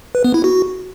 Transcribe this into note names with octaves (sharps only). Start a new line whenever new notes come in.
B4
B3
E4
F#4